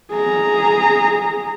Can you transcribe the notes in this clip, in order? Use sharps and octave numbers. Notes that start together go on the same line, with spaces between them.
G#4 A#5